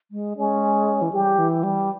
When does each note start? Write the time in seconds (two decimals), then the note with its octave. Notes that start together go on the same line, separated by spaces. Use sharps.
0.11 G#3
0.37 G#3 C#4
1.02 E3
1.13 G3 G4
1.38 E3
1.63 G3